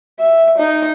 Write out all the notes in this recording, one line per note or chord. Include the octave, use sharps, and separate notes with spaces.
E5
D#4